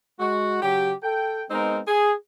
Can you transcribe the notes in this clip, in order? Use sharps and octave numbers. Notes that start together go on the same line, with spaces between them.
G#3 F#4
C#3 F#3 G4
A4 G5
G#3 B3 C4 D#4 A#4
G#4